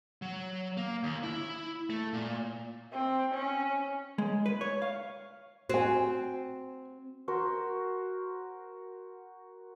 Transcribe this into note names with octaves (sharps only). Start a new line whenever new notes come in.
F#3
A#3
D#2
E4
A3
A#2
C4
C#4
G#3
B4
C#5
F5
C4 F#4 G#5
F#4 A#4 C5